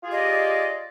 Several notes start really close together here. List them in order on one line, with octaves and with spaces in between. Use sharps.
F4 G#4 G4 D#5 D5